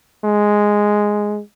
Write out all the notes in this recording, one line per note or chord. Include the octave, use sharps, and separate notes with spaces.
G#3